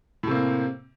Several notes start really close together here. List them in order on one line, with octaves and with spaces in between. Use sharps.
A2 C3 A#3 C4